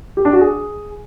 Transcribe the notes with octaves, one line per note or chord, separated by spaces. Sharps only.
G4
D4
F#4
G#4